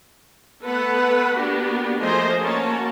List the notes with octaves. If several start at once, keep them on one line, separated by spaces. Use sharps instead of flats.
A3 B3 A4 B4 F#5
A#3 B3 D4 F#4 G4
F3 A3 A#3 G#4 C5 D#5
A#3 C#4 F#4 A5